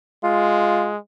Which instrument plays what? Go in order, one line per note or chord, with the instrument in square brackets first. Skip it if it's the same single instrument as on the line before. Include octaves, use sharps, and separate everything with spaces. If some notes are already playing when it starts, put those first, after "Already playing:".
[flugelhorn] G#3 [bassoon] F4